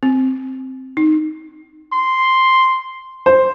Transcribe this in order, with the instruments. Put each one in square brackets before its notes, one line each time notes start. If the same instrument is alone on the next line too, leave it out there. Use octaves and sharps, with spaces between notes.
[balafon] C4
D#4
[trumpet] C6
[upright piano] C5